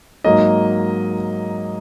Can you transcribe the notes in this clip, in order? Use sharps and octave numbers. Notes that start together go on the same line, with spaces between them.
G#2 F#3 A#3 D#5